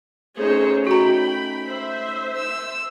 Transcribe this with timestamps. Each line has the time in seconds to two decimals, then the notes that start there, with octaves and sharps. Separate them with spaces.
0.37 A3 C#4 D#4 G#4 C5 C#5
0.87 F#4 G5 A#5 B5
1.67 C5 E5
2.36 E6